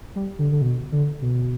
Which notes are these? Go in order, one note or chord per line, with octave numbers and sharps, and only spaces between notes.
G3
D3
D3
B2
D3
B2